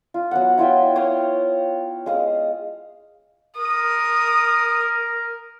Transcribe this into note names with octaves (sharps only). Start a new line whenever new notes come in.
F4
F#3 B3 F#5
E4 F4 E5 G5
C#5 F5 G5 D#6
G#3 F5 D#6
A#4 D#6